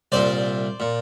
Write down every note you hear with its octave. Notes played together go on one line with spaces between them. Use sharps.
C2 A#2 C5 D5
A#2